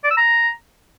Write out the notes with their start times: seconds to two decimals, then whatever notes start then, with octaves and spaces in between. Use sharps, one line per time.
0.04 D5
0.10 E6
0.17 A#5